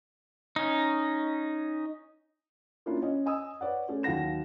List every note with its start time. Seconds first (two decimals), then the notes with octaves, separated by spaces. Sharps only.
0.56 C#4 D#4
2.86 A#3 C#4 D4 E4 F4
3.02 C#4 D#5
3.26 D#5 G#5 D#6 E6
3.61 B4 C#5 D5 F#5
3.88 A3 C#4 G#4 A4
4.03 D#2 F#3 F5 F#5 A#6 E7